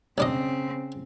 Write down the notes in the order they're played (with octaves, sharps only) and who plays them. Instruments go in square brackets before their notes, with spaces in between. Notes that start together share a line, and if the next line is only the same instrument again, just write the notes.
[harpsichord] B1 D4 D#5 [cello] C#3 C4